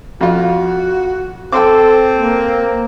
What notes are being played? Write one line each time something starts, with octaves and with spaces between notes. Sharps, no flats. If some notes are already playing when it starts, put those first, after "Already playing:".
F2 F4 F#4
C4 A4 G5 C6 D6
A#3